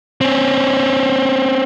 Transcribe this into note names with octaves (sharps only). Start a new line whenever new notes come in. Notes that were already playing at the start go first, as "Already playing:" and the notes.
C4 C#4